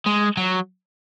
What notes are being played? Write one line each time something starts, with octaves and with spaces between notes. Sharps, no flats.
G#3
F#3